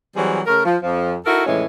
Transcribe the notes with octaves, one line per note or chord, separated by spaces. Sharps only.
E3 F#3 G3 C4 G#4
C#3 A3 A#4
F3
F2 F3
D#4 E4 F#4 A4 A#4
F2 A2 E3 G#3 C#4